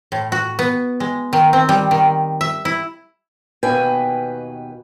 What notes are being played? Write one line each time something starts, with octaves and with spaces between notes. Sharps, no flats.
A2
F#4
B3
G#3
D#3
C4
G3
D#3
E5
E4
D#2 B2 B4 G5 G#5